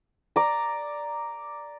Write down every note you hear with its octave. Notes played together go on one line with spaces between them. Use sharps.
D5 A#5